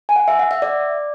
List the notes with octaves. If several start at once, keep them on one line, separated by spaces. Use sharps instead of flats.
G#5
F#5
E5
F#5
E5
D5